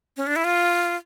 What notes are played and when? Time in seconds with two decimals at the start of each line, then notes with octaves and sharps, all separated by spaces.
0.17 C#4
0.27 D4
0.36 E4
0.44 F4